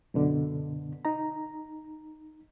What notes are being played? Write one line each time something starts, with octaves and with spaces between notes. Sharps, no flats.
F#2 B2 D3
D#4 A#5